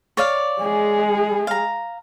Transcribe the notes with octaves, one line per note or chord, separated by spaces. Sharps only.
C#5 D5 F5
G#3 G#4
F5 A#5